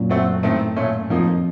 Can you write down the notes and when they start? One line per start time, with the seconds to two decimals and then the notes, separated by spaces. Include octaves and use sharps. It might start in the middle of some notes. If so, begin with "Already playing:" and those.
Already playing: F#2 A#2
0.09 A3 C4 F#4
0.43 A2 D#3 A3 C4
0.76 A#2 A3 C#4
1.10 F2 F3 A#3 D#4